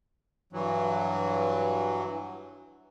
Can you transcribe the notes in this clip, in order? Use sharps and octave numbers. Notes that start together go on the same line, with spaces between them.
G2 E3 F#3